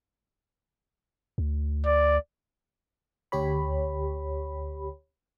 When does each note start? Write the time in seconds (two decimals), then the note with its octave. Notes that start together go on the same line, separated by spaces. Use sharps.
1.38 D2
1.86 D5
3.32 D2 G4 C#5 B5